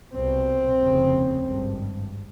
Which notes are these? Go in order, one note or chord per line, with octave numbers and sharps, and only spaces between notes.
C2 B2 C4
F1 D#2 C#3
G#1 G2